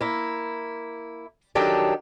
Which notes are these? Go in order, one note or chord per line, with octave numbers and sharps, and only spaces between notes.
A#3 E4
D#3 F#3 D4 G4 A4